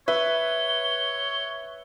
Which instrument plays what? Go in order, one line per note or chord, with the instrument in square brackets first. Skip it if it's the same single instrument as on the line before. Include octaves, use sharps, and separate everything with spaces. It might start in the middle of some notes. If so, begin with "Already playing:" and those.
[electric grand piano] B4 [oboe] C#5 [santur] E5 [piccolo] G7